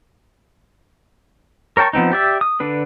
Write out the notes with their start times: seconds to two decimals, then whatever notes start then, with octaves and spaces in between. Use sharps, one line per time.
1.77 A#4 C#5 G5 A5 C#6
1.93 F3 B3 C4 D#4
2.12 G4 D5 E5
2.41 D#6
2.60 D3 D4 B4